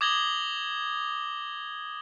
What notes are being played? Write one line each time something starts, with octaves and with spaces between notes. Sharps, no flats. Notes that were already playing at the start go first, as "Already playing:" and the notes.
D6 D#6 G#6 A#6 F#7 G7